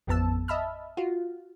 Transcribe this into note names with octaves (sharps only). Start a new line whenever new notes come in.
A1 F2 B3 A5 E6
D#5 E5 A5 B5 E6 F6
F4 F#4